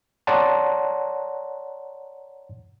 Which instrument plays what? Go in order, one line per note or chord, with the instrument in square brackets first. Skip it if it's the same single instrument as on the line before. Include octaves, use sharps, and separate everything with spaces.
[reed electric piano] C#5 D5 F#5 A5 A#5 C6